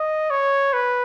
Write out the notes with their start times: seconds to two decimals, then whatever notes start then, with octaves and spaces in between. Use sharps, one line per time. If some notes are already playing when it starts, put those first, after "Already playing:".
Already playing: D#5
0.30 C#5
0.73 B4